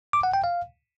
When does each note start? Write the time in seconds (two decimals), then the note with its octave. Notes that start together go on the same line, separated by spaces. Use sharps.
0.13 D6
0.23 F#5
0.34 G5
0.44 F5